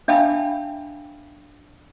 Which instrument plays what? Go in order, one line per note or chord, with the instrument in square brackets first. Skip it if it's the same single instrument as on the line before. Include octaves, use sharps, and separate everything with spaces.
[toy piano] D4 E5 F5 G5 A5 B5